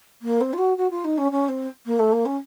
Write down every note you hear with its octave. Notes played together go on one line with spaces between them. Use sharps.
A#3
C4
F4
F#4
F#4
F4
D#4
C#4
C#4
C4
A#3
A3
A#3
C#4